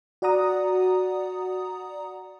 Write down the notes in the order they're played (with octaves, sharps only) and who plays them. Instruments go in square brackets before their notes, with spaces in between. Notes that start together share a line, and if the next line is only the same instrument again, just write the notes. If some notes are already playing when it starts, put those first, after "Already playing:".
[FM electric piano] F#4 D5 F#5 A#5 D#6